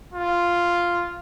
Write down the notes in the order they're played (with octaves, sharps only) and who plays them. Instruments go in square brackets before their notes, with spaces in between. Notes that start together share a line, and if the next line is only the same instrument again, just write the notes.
[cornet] F4